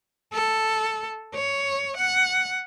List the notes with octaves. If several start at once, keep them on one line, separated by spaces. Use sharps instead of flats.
A4
C#5
F#5